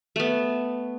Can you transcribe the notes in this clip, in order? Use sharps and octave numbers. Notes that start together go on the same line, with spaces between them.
A3 B3